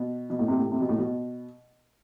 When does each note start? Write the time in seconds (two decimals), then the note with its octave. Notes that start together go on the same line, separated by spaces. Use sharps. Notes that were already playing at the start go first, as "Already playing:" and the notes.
Already playing: B2
0.30 B2
0.39 A2
0.48 C3
0.57 A2
0.72 C3
0.80 B2
0.89 A2
0.98 B2